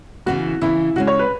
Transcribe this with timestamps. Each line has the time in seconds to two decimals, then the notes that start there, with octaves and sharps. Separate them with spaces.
0.26 C#3 E3 B3 F#4
0.61 C#3 E3 B3 E4
0.96 C#3 G#3 C#4 F#4
1.07 C#5
1.19 B4